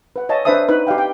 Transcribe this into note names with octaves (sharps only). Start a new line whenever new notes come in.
B4 F#5
C#5 D#5 F5 A5
D4 B4 C5 E5 A5 D#6
D#4 B4 B5
G4 D#5 F5 G5
G5